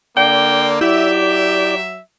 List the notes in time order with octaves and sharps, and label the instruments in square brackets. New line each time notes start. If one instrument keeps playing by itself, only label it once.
[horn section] D3 A#3 [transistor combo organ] D5 [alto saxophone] G5
[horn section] F#3 E5 [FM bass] E4 [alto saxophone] G4